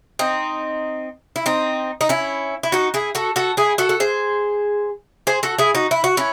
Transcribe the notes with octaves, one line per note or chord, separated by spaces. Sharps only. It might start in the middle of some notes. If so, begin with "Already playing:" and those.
C4 D#4
E4
C4 D#4
D#4
C#4 E4
E4
D#4 F#4
E4 G#4
F#4 A4
F#4 A4
E4 G#4
F#4 A4
A4
G#4 C5
G#4 C5
F#4 A4
E4 G#4
D#4 F#4
E4
F#4
C#4 E4